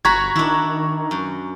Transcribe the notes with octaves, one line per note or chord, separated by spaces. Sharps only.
G1 F#4 F#5 A#5 B5 C#6 G#6
D#3 D4 E4
F#2